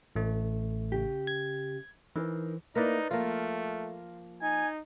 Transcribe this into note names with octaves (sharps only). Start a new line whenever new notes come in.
A1 A3
C#3 G4
G#6
E3 D#4 A#4 C5
A#3 D#4 E4 A#4 B4 D5
F3 A3 A#3 F4 A#4
D#4 G#5